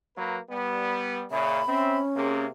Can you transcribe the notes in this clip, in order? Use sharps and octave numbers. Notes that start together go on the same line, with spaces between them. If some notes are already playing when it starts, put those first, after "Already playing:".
F#3 A#3 B4
G3 B3
A#2 C#3 E5 B5
C4 C#4 E5
C3 A#3 G#4